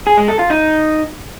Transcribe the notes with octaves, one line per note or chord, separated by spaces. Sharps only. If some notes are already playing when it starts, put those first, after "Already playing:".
G#4
G#3
A4
F4
D#4